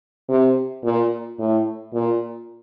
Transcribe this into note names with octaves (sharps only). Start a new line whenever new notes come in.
C3
A#2
A2
A#2